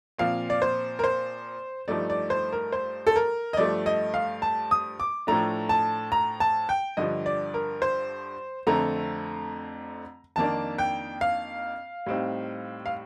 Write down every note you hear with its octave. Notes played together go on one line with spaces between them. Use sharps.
A#2 F3 C4 F5
D5
C5
A#4
C5
G2 F3 A3 D#4 D5
D5
C5
A#4
C5
A4
A#4
D#5
G2 F3 A3 D5
D#5
F5
A5
D#6
D6
A2 F3 A3 D4 A#5
A5
A#5
A5
G5
G2 D3 F3 D#5
D5
A#4
C5
F2 D3 A3 C4 A#5
F2 D#3 A#3 D4 A5
G5
F5
A2 G3 C4 D#4
F5